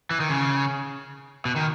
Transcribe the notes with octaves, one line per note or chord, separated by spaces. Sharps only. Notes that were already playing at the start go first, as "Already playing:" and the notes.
E3
D#3
C#3
B2
D#3